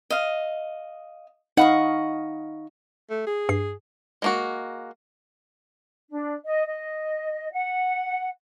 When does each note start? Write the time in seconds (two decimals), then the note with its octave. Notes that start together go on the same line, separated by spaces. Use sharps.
0.10 D#5 F5
1.57 D#4 D#5 F5 F#5 B5 C#6
3.10 A3
3.27 G#4
3.49 G2 C7
4.22 G#3 A#3 F#4
6.09 D4
6.44 D#5
6.66 D#5
7.51 F#5